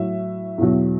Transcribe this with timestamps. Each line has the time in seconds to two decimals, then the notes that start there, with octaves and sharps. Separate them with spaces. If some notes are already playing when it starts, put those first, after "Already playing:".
Already playing: A2 F#3 E5
0.58 E2 B2 F#3